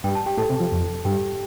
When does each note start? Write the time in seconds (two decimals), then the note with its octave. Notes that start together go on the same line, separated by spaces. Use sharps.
0.04 G2 G5
0.15 A5
0.26 G4 G5
0.37 A2 A4 A5
0.50 C3
0.60 F3
0.72 F2
1.05 G2 G4 G5